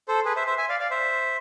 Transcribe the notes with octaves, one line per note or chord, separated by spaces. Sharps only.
A4 C5
G#4 B4
C5 E5
C5 E5
E5 G#5
D5 F5
D5 F5
C5 E5